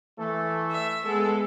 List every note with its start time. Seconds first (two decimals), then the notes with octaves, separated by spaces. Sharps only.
0.18 E3 A3 A4
0.71 E5
1.06 G#3 B3 A4